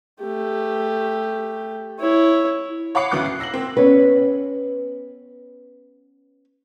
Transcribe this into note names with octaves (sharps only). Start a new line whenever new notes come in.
A3 G4
E4 C#5
C#5 F#5 B5 D6 C7 C#7
D2 C#3 E3 F#3 D6 F#6
C7
E6 A#6 C7 F#7
A#3 C4
B3 C#4 B4